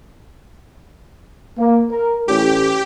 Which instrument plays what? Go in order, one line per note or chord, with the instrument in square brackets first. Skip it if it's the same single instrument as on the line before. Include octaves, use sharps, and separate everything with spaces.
[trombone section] A#3
A#4
[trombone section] A1 A2 C#4 [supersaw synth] G4